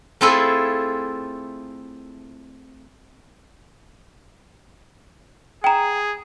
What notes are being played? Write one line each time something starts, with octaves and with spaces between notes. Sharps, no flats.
A3 C4 E4 F4 G#4 A4
G#4 G5 A#5